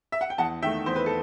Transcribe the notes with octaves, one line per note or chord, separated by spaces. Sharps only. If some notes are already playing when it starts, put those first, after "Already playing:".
E5
F#5
G5
E2 F#5 A5
D#3 A3 E5 G5
E2 C5
B4
A4